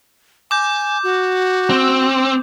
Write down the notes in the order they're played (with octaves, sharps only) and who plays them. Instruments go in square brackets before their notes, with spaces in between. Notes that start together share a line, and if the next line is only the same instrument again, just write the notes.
[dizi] G#5 [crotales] D6 G6
[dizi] F#4
[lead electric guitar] C4